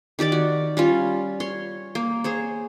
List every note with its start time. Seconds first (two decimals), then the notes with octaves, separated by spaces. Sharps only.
0.19 D#3 G4 D5 D6
0.32 F#4
0.77 G3 C#4 F4
1.40 C#5 C6
1.95 A#3
2.24 G#4 C5 C#5